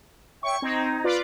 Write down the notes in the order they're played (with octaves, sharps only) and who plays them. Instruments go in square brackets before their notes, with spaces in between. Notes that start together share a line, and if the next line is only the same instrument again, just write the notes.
[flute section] C#5 E5 G5 [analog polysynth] C#6
[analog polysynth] C4 [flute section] D#4 A#5 G#6
[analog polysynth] F4 B4 D5